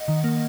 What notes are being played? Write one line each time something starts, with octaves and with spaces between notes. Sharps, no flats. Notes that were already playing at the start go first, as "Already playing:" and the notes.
Already playing: D#5 F#5
D#3
A#3